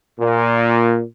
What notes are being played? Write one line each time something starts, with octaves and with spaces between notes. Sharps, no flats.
A#2